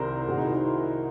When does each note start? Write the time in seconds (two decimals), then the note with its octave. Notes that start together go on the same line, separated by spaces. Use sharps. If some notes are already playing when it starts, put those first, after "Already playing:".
Already playing: C2 C3 D#3 A#4 C5
0.28 C2 C3 D#3 F#4 G#4
0.38 D#4
0.45 E4